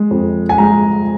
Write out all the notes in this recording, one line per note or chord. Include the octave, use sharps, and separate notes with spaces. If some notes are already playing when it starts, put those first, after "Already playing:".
Already playing: G#3
F2
G#5
G#3 A#5